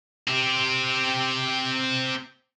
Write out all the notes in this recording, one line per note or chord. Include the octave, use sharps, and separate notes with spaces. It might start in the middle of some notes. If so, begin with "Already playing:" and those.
C4 G4